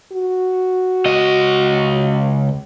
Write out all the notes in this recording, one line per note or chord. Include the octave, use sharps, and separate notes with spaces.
F#4
C#2 D#5